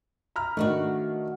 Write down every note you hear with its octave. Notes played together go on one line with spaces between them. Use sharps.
A#5 B5 F6
D#3 A3 D4 F#4